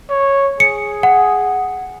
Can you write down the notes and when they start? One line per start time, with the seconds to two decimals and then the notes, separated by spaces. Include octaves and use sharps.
0.10 C#5
0.60 G#4 C#7
1.03 F#5